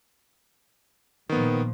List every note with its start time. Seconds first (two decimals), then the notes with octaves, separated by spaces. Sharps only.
1.29 A#2 D#3 F3 B3